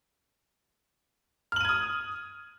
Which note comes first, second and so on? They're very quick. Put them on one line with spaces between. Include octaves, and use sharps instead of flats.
F6 F#7 D#7 G#6 D#6